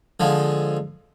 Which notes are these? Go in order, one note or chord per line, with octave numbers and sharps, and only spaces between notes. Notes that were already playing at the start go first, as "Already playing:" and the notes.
D3 F3 G#3